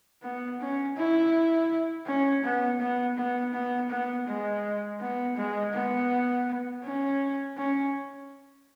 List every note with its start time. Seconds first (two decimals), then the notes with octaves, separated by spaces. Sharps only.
0.23 B3
0.60 C#4
0.97 E4
2.06 C#4
2.44 B3
2.80 B3
3.17 B3
3.53 B3
3.90 B3
4.27 G#3
5.01 B3
5.37 G#3
5.74 B3
6.84 C#4
7.57 C#4